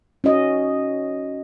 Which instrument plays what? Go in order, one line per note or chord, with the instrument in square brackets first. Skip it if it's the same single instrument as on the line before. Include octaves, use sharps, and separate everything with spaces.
[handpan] C#4 F#4 D#5